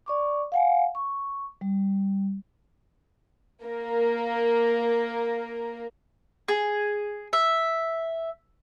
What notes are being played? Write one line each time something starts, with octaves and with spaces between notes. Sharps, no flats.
D5 C#6 D6
F5 F#5 G#5
C#6
G3
A#3 A#4
G#4
E5